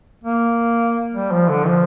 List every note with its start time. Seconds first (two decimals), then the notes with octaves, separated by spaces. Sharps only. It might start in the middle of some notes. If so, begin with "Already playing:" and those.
0.24 A#3
1.14 G3
1.31 F3
1.50 D3
1.67 F3